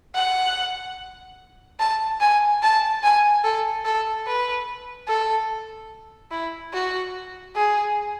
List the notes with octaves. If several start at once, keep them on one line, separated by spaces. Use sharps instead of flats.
F#5
A5
G#5
A5
G#5
A4
A4
B4
A4
E4
F#4
G#4